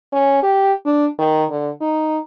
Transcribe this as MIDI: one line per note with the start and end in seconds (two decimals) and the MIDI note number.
0.12 0.41 61
0.43 0.73 67
0.85 1.07 62
1.19 1.44 51
1.50 1.70 50
1.81 2.19 63